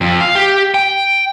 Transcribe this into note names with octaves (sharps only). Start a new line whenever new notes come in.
F2
F5
G4
G5